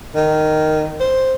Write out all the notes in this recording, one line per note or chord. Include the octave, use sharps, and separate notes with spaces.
D#3
C5